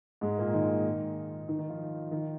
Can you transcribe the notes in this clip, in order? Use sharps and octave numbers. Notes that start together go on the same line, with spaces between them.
G#2 G#3
A#2 A#3
D#3 D#4
D#3 D#4
D#3 D#4
F3 F4
D#3 D#4